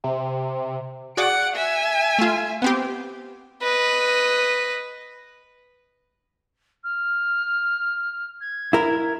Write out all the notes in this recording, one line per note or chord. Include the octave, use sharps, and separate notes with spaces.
C3
F#4 G#4 D5 F#5 D7
E5 G#5
A3 F4
B3 C4 G4
B4 D#5
F6
G#6
E4 A#4